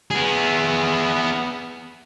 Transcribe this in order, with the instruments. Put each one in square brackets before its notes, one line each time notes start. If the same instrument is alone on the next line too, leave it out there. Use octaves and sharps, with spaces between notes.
[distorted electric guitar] B3 G#4